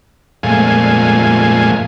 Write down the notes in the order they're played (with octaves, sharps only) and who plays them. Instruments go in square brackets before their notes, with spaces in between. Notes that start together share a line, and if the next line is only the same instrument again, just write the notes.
[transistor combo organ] F2 A#2 G#3 A3 F5 G#5